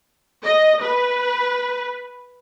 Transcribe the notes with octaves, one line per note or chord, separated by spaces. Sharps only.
D#5
B4